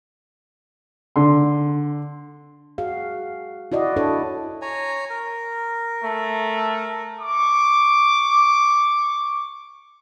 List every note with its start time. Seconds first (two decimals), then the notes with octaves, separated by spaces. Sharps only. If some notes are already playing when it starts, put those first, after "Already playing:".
1.16 D3 C6
2.78 F#4 G#4 F5
3.72 E4 F#4 D5 D#5
3.96 D4 E4 A4 C#5
4.62 C#5 G#5 A#5
5.10 A#4
6.04 A3
7.19 C#6 D6